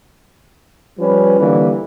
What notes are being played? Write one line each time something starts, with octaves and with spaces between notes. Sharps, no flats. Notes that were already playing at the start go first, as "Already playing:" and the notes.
F3 G3 C#4 B4
D3 E3 G3 A#3